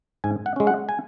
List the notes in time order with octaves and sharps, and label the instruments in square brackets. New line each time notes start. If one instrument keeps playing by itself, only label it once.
[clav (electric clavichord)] G#2 G#5
F#5
G#3 C#4
F#5
G#5